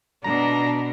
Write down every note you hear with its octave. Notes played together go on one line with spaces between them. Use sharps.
B2 D4 A#5